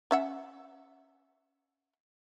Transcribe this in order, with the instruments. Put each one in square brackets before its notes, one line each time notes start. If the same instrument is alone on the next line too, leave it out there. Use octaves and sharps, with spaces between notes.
[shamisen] C#4 E5 F#5